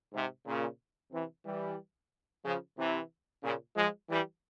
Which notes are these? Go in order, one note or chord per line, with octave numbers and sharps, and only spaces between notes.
G#2 C3
A#2 C#3
C3 E3
E3 G3
C#3 F3
C3 E3
A#2 C#3
F3 G#3
E3 G3